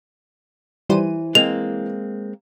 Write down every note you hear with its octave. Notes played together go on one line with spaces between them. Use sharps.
E3 G3 C5 D#7
G#3 A#3 C4 F7